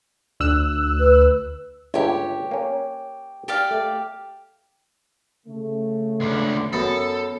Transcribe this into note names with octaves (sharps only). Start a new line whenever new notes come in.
D2 E6 F#6
B4
G1 C#2 G4 C#5 E5
A#3 C#4
G4 D5 F5
A3
C#3 A3
C#2 D3
F#2 B3 A4